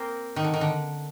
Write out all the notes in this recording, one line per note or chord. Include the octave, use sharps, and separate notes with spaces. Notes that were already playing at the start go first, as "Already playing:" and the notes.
Already playing: A#3 C4
D#3
D3
D#3
D3